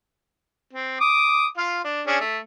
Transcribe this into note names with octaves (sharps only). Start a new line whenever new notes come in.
C4
D6 D#6
F4 F5
D4
C#4 D4 G#4
A3